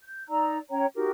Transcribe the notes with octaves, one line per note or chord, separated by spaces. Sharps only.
G6
D#4 D5 A#5 E6
C#4 C#5 G5 A#5
D#4 F#4 G4 A#4